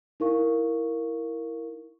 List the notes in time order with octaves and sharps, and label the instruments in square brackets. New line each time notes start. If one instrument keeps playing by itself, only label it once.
[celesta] D#4 E4 A#4 F5 C#6